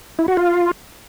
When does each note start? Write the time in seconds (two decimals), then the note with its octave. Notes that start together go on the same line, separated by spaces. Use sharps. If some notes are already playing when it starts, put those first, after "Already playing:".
0.19 E4
0.28 F#4
0.37 F4